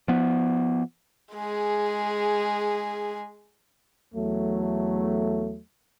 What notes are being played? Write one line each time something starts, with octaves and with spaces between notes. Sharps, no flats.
F3 B3
G#3 G#4
E2 F#3 A3